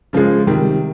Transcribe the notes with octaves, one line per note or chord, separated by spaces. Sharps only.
C#3 F3 G#3
C3 D#3 G3